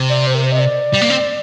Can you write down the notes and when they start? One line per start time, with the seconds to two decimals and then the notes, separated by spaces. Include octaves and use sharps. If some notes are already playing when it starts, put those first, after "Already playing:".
Already playing: C3
0.10 D5
0.27 C5
0.35 A#4
0.43 C5
0.52 D#5
0.60 D5
0.94 G3
1.01 A#3
1.10 C4